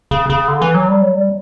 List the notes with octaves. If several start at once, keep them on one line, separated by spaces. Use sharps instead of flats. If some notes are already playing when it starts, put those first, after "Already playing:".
C#3
C#3
D3
E3
F#3
G3
F#3
G3